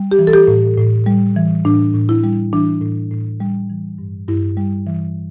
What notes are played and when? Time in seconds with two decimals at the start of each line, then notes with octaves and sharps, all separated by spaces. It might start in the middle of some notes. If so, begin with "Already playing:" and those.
Already playing: G3
0.11 G4
0.19 E3
0.27 A4
0.34 G4
0.48 A2
0.78 A2
1.06 G3
1.36 E3
1.65 A2 D4
1.94 A2
2.09 E4
2.24 G3
2.53 E3 D4
2.81 A2
3.11 A2
3.40 G3
3.70 E3
3.99 G2
4.28 G2 E4
4.57 G3
4.87 E3